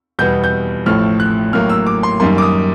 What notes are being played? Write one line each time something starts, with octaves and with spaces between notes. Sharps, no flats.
E2 B2 G3 B3 G6
G6
A1 A2 F3 F6
F#6
A1 A2 F#3 A#3 F6
E6
D6
C6
F#2 D#3 G3 A#3 C6
D6
D#6